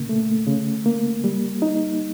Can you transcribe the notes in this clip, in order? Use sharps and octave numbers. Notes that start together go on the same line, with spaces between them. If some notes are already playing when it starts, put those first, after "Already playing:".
Already playing: A#2 C#3 A#3
A3
C#3
A#3
G3
D#4